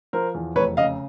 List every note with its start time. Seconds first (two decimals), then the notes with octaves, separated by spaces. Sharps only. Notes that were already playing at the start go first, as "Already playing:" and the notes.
0.13 F3 A#4 C5
0.35 E2
0.56 F1 B4 C#5
0.77 C#3 D#5 F5